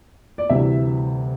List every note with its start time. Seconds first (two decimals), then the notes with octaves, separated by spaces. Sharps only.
0.38 D5
0.49 D2 C3 E3 G3 E5